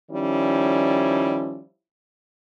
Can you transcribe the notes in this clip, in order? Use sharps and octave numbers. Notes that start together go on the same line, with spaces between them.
D#3 F3 G3 C#4 E4